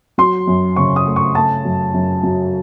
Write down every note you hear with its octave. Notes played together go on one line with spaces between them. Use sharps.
F#3 C6
F#2
C#3 C#6
D#6
A3
C#6
A3 A5
F#2
F#2
F#3